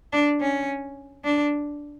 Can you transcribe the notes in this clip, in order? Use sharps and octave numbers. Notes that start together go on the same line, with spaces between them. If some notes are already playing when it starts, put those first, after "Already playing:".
D4
C#4
D4